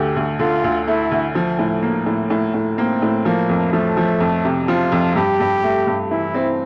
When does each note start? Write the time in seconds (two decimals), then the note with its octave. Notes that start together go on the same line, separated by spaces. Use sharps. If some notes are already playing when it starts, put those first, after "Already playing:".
Already playing: D2 D3 G4
0.16 D2
0.39 D3 F4
0.64 D2
0.87 A3 E4
1.11 D2
1.35 F3
1.58 A2
1.83 A#3
2.06 A2
2.30 A2
2.54 A2
2.78 A#3 C4
3.02 A2
3.25 F3 A#3
3.49 F2
3.73 F3 A3
3.97 F3
4.20 F2
4.45 C3
4.68 F3 F4
4.92 F2
5.16 G2 G4
5.40 G2
5.63 A3
5.87 G2
6.11 E3 E4
6.34 C4